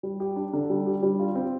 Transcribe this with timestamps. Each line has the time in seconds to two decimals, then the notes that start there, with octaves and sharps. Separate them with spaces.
0.03 G3
0.20 G4
0.36 D4
0.53 D3
0.70 G3
0.87 G4
1.03 G3
1.19 F4
1.35 C4